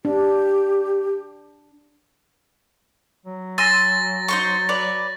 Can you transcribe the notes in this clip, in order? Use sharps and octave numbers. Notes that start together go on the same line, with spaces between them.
D4 G4
F#3
G#5 C6 E6 A6 A#6
D#4 C5 C#6
B4 C#5 D5